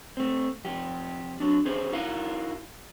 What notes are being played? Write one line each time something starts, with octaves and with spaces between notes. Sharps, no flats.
A3 C4
F2 G4
F#3 D4
C#4 G4 G#4 C5
D#4 E4 F#4 A#4 F5